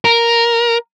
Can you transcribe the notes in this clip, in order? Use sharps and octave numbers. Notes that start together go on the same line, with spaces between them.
A#4